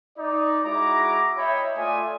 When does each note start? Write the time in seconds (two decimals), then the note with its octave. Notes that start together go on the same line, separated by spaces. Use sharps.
0.17 D#4 D5
0.64 G#3 E4 F#4 A#5 D6
1.38 C#5 D#5 E5 G5 B5
1.76 A3 F4 D5 E5 G#5 D#6